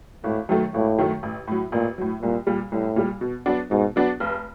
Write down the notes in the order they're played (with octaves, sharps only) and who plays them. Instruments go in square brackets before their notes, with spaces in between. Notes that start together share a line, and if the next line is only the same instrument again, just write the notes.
[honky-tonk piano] G#1 [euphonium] A2
[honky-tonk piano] F#2 D#3 F#3 A3
[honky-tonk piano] G#1 [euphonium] A2
[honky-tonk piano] F#2 D#3 F#3 A3
A1
A2 F#3
[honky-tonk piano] A1 [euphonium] A#2
[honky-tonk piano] A2 F#3
[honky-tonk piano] C2 [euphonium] A#2
[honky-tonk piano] A#2 G3
[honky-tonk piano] C2 [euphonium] A2
[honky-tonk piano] A#2 G3
B2
F#3 B3 D4 F#4
[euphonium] G#2 [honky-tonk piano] B2
[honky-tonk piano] F#3 B3 D4 F#4
F1